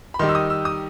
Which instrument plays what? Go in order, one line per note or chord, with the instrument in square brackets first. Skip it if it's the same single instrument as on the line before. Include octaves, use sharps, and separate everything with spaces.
[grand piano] B5
[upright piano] D#3 G3 D#4 G4 [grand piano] C6
[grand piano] E6
D#6
E6
D#6